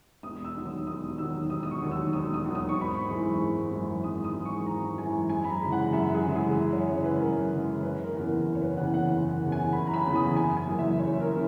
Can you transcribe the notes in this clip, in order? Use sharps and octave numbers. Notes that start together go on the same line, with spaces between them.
E1 D#6
E6
D#2 D#3 F#3
D#6
E1 D#6
D#2 D#3 F#3 E6
E1 D#6
D#6
C#6
D#2 D#3 F#3
E6
E1 D#6
D#6
D#2 D#3 F#3
D#6
C#6
G#1
B5
C#6
F#2 E3 G#3
G#1
F#2 E3 G#3
G#1 D#6
D#6
F#2 E3 G#3
C#6
G#1 A#5
F#2 E3 G#3 G#5
F#2 G#5
B5
A#5
C#3 E3 G#3
F#5
F#2 E5
G#4
C#3 E3 G#3
G#4
F#2
C#5
C#3 E3 G#3 C#5
B4
F#2 A#4
C#3 E3 G#3
F#1 B4
A#4
E2 C#3 E3
A#4
F#1 A#4
C#5
B4
E2 C#3 E3 F#5
F#5
F#1 F#5
E2 C#3 E3
G#5
F#1 B5
A#5
B5
E2 C#3 E3
D#6
F#1 G#5
G#5
F#2 C#3 E3 A#3
E5
F#1 C#5
A#4
C#3 E3 A#3